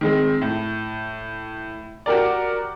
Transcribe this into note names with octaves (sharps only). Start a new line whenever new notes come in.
D#3 G#3 C4
A2
F#4 G4 A#4 D5